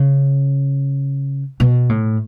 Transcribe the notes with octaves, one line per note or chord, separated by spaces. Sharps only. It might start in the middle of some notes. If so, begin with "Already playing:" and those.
Already playing: C#3
B2
A2